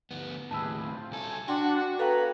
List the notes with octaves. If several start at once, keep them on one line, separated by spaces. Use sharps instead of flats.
D2 B3
D#2 A2 G4 G#4 B4 A5 E6
C4 F4
C2 A3 A4 G#5
D4 F#4 F#5 G5 C6
B3 A4 B4 C#5 F5 G5 A#5